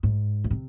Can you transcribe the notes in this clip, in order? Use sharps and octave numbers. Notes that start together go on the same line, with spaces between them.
G#2
A#2
C3